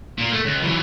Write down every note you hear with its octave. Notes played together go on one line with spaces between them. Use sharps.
A#2 A#3
A3
C#2
E3 F#3